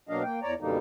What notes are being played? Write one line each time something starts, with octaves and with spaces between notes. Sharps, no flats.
B2 F#3 A#3 D4 D#5 F5
A#3 G5
E2 C#5 D5 A#5
F#2 B2 D3 G3 A#3 D#4